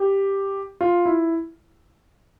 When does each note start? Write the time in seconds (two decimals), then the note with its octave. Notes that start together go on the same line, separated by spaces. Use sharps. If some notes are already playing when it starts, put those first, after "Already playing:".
Already playing: G4
0.81 F4
1.06 E4